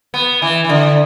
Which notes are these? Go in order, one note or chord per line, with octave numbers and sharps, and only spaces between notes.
B3
E3
E3
D3